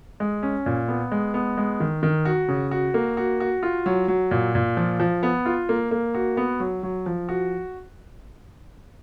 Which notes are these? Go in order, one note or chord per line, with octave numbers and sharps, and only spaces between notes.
G#3
C#4
A#2
B3
G#3
B3
G#3
D#3
D#3
F#4
C#3
F#4
A#3
F#4
F#4
F4
F#3
F#3
A#2
A#2
F3
F3
B3
F4
A#3
A#3
F#4
B3
F#3
F#3
F3
F#4